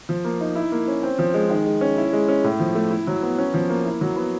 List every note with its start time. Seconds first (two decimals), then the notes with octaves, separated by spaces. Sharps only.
0.09 F3
0.25 A#3
0.41 D#4
0.55 E4
0.72 A#3
0.88 C#4
1.03 C4
1.19 F3
1.34 G#3
1.50 D#3
1.66 G#3
1.81 C#4
1.97 E4
2.13 G#3
2.28 C#4
2.44 A2
2.60 F3
2.75 A3
2.91 E4
3.07 F#3
3.22 B3
3.38 C#4
3.54 F3
3.69 A#3
3.85 E4
4.01 F#3
4.16 B3